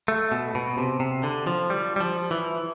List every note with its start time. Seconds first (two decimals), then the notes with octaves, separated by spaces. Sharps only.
0.08 A3
0.32 B2
0.55 B2
0.78 C3
1.00 C3
1.23 D3
1.47 F3
1.70 G3
1.96 G3
2.00 F3
2.31 E3